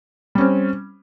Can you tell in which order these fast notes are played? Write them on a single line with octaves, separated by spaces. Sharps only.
G3 C#4 C4